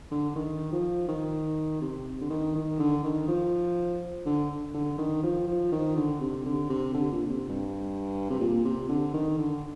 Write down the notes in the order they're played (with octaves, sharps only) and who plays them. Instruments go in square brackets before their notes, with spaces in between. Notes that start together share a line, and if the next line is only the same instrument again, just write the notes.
[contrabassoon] D3
D#3
F3
D#3
C3
D3
D#3
D#3
D3
D#3
F3
D3
D3
D#3
F3
F3
D#3
D3
C3
D3
C3
D3
A#2
D3
C3
G2
C3
A#2
C3
D3
D#3
D3